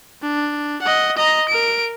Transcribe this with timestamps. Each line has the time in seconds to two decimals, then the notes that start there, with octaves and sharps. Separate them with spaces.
0.22 D4
0.82 D#5 F#5
1.17 D#5 A#5
1.49 A#4 D7